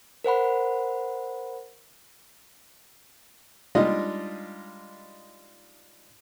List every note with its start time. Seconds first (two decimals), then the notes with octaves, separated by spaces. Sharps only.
0.24 A#4 C5 F#5 B5
3.75 G3 G#3 D4 D#4 F4 D#5